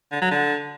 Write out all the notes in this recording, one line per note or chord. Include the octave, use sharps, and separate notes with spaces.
D3
F#3
D3